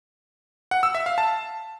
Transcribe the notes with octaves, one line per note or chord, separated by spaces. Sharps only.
F#5
E6
E5
F5
A5